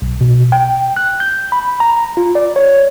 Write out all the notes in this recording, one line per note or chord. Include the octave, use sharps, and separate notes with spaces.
B1
B2
G5
F#6
G6
B5
A#5
F4
D5
C#5